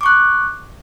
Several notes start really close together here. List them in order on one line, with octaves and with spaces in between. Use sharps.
D6 C#6 F#6